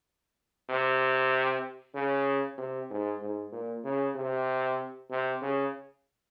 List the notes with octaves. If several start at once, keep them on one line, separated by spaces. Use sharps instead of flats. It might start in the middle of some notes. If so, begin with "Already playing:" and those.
C3
C#3
C3
G#2
G#2
A#2
C#3
C3
C3
C#3